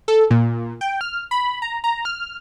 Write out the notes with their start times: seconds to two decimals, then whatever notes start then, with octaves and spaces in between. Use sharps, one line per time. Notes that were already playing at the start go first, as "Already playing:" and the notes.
0.08 A4
0.31 A#2
0.81 G5
1.01 F6
1.31 B5
1.62 A#5
1.84 A#5
2.05 F6